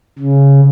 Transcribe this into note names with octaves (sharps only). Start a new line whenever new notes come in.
C#3